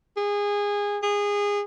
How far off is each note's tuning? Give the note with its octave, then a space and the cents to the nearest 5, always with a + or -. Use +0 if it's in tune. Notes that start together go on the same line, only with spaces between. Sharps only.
G#4 -20
G#4 -25